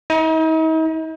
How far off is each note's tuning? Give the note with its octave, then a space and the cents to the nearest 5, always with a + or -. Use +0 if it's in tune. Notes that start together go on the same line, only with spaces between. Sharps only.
D#4 +45